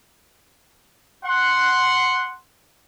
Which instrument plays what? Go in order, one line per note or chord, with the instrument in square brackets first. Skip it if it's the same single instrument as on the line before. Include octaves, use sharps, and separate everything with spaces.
[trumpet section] F#5 C6